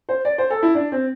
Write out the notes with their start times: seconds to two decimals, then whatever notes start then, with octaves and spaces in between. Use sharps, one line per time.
0.09 C5
0.25 D5
0.38 C5
0.50 A4
0.63 E4
0.75 D4
0.92 C4